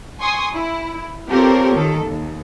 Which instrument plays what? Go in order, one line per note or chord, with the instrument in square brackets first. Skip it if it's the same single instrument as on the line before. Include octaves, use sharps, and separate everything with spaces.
[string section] G#5 C6 C#6 D#6
E4
C4 F4 G4 A4 A#4 C#5
D#3 A4
D#2